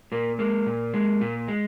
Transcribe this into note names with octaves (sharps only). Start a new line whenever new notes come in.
A#2 A#3
G#3 A#3
A#2
G#3
A#2
G#3